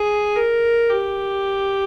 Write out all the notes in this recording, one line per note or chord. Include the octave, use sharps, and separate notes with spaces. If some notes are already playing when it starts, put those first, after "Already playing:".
Already playing: G#4
A#4
G4